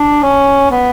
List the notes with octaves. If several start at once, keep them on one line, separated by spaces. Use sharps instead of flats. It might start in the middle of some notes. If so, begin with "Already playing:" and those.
Already playing: D4
C#4
B3